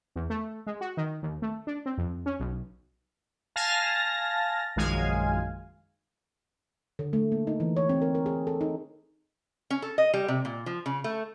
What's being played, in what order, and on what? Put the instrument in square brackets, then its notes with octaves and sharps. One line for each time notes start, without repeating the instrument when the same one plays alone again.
[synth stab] E2
A3
G#3
F#4
D#3
D#2
A3
D4
C4
F2
C#4
B1
[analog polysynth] F5 G#5 A5 F6 A6 A#6
A#1 F#2 D#3 G#3 F5 G#5
[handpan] D3
A3
A#3
D#4
E3
C#5
C4
A#4
A#4
G#4
A4
D#4
[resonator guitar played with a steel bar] C#4
A4
D#5
G3
C3
A#2
F3
C#3
A3